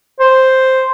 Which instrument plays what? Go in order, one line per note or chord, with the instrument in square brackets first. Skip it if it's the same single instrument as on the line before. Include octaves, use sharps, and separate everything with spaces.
[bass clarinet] C5